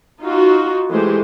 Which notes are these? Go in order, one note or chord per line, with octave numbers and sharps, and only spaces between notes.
D#4 F4 F#4
E3 G#3 A3 G4 C5